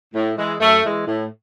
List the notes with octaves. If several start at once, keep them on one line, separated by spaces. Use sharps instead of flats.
A2
E3 G#3
F#2 A3
E3 G#3
A2